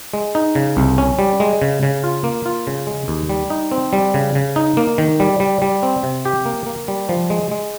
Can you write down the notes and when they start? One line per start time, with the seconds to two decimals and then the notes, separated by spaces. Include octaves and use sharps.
0.14 G#3
0.35 D#4
0.55 C#3
0.77 C2
0.98 C#4
1.19 G3
1.40 G#3
1.62 C#3
1.83 C#3
2.04 F4
2.24 A#3
2.46 F4
2.67 C#3
2.87 G#3
3.08 D#2
3.29 G3
3.50 D#4
3.71 C4
3.93 G3
4.14 C#3
4.35 C#3
4.56 D#4
4.77 A#3
4.98 D#3
5.20 G3
5.40 G3
5.62 G3
5.83 C4
6.03 C3
6.25 G4
6.46 A#3
6.66 A#3
6.88 G3
7.09 F3
7.30 G#3
7.51 G#3